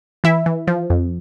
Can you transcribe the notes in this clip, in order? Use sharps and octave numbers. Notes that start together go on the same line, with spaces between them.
E3 E4 E5
E3
F3
F2